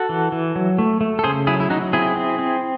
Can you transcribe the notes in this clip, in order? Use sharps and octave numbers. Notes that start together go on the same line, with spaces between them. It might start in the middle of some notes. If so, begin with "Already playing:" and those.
Already playing: F#4 A4
E3
E3
F#3
A3
A3
A4
C#3 G#4 C5
F#3 E4 G#4
E4
F#3 D#4 F#4
C4 E4 G#4
C4
C4